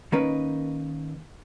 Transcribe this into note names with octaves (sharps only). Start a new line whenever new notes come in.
D#3 A#3 C#4 D#4 A#4 B4